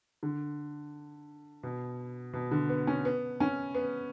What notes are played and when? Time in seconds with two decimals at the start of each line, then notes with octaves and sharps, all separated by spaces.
0.23 D3
1.63 B2
2.33 B2
2.51 D3
2.69 B3
2.87 C#4
3.05 B3
3.40 C#4
3.74 B3